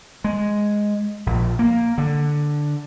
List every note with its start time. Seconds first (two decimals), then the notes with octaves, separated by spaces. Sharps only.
0.24 G#3
1.26 A#1
1.59 A#3
1.98 D3